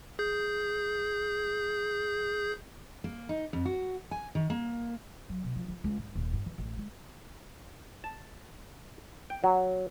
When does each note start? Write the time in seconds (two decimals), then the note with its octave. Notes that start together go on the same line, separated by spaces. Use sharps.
0.19 G#4 G6
3.04 A#3
3.29 D#4
3.53 F2
3.65 F#4
4.11 G#5
4.35 D#3
4.50 A#3
5.29 F#3
5.44 B2
5.56 F3
5.68 F3
5.84 C#2
5.98 G#2
6.15 D#1
6.33 G2
6.46 E3
6.58 A1
6.77 G#3
8.04 A5
9.30 G5
9.44 F#3